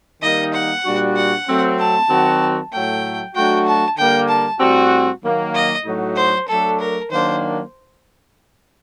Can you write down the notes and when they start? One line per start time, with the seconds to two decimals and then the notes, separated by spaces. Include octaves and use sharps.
0.22 D#3 G3 A#3 D#4 D#5
0.53 F#5
0.84 A#2 G3 D4 F#4
1.16 F#5
1.48 F#3 A3 C4
1.78 A5
2.09 D#3 F#3 C4 F#4
2.72 A2 F#3 A3 G5
3.35 F#3 A3 D4 F#4 G5
3.66 A5
3.98 D3 G3 A#3 G5
4.28 A5
4.60 A2 G3 C4 F#4
5.23 D#3 F#3 A#3
5.54 D#5
5.85 A2 F#3 A3 D#4 F#4
6.16 C5
6.48 F#3 A3 D4 A4
6.80 A#4
7.11 D#3 F#3 A#3 D4 C5